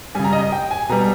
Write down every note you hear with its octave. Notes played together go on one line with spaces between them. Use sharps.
C#3 G3 G#5
A#5
D#5
D#5
G5
G#5
B2 G3 A#5